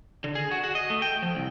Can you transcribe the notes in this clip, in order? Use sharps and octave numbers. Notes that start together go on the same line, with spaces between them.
D3
G#4
F#4
F#4
D#5
A3
G5
F3
C2